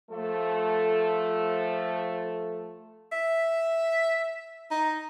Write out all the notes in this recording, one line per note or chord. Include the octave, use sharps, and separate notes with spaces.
F3 A3 A4
E5
D#4